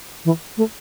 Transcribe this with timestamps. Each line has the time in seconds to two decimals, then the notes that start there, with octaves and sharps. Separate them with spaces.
0.25 E3
0.57 A3